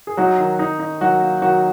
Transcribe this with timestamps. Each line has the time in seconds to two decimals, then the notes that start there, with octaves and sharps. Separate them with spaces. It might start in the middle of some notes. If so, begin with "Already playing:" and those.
0.07 G#4
0.17 F#3 D#4 F#4
0.38 D#3
0.59 D#4
0.79 D#4
1.01 D#3 F#3 F#4
1.21 A#3
1.41 D#3 F#3 F#4